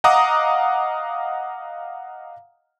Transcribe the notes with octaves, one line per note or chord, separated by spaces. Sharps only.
D#5 F5 F#5 A#5 D6 D#6